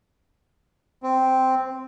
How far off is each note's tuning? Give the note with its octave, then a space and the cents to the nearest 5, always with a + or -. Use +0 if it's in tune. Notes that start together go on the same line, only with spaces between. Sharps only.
C4 -5